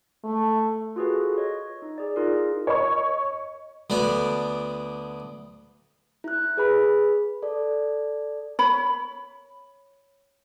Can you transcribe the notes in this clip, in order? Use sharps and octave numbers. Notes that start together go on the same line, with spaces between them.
A3
F4 F#4 G#4 A4 B4
C#5 D#5
D#4
G#4 D5
D#4 F4 G#4 A#4
C#5 D#5 C#6
D2 D3 B3 D5
E4 F#6
G#4 B4 B5
A4 D5
C#5 B5